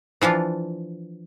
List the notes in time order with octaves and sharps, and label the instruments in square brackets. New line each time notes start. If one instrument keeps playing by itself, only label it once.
[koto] E3 F3 D4 F4